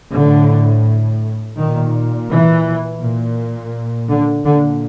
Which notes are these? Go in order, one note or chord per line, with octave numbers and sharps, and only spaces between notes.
A2 D3
A#2 D#3
E3
A#2
D3
A#2 D3